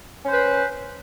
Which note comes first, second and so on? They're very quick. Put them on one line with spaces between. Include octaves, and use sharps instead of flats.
C#4 C5 B4